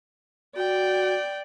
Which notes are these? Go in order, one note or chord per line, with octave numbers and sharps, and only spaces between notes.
F#4 D5 G5